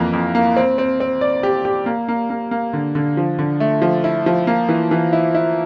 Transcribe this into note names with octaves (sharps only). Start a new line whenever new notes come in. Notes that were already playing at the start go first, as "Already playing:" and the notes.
Already playing: F2 E3 A#3
F2
A#3
C4
C4
C4
D5
G4
G4
A#3
A#3
A#3
A#3
D3
D3
F3
D3
A3
F3
E4
F3
A#3
E3
E3
E4
E4